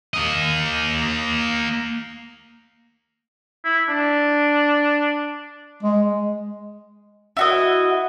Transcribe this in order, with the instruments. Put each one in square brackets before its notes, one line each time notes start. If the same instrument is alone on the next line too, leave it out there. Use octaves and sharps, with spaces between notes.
[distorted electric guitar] A#3 D#5
[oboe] E4
D4
[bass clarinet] G#3
[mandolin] E4 F#4 D#5